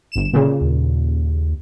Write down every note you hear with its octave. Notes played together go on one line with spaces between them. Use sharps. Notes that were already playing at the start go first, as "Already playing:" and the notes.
G1 E7
A#2 C#3
D#2